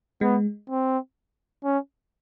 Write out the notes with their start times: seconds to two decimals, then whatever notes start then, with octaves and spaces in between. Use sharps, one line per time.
0.21 G#3 B3
0.70 C4
1.64 C#4